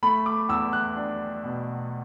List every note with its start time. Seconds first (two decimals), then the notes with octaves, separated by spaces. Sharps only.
0.03 A3 B5
0.26 D6
0.49 E2 E6
0.73 F#6
0.97 D4
1.44 B2